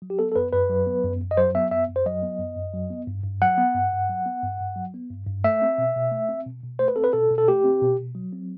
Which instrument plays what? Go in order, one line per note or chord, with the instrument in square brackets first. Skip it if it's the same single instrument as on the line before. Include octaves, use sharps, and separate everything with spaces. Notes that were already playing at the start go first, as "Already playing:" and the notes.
[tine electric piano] F#3
G4
B3 A4
A4
F#2 B4
F#2 B4
F#3
B3
F#2
F#2
D#5
F#3 C5
B3 E5
F#2 E5
F#2
C5
F#3 D#5
B3
F#2
F#2
F#3
B3
G2
G2
F#3 F#5
B3
G2
G2
F#3
B3
G2
G2
F#3
B3
G2
G2
A3 E5
C4
B2
B2
A3
C4
B2
B2
A3 C5
B4
C4 A4
B4
B2 A4
B2
A4
A3 G4
C4
B2
B2
F#3
C4